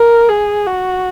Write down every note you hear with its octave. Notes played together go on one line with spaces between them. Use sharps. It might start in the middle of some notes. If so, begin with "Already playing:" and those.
Already playing: A#4
G#4
F#4